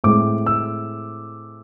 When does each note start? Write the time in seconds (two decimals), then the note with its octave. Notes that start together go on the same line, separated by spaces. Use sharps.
0.04 A2 G#3 C4 D6
0.46 E6